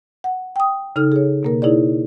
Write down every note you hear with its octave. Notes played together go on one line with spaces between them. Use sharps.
F#5
G5 D#6
C#3 D#4 A4 F6
G#4 C#5
B2 A#3 A#4
D#4 E4 G#4 C#5 D5